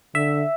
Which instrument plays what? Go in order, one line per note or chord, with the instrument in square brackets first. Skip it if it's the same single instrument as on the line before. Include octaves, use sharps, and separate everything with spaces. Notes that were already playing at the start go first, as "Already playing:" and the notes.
[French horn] D3 [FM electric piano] E5